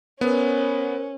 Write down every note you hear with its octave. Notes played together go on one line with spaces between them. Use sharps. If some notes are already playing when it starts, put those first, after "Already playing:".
B3 C#4 A#4 C5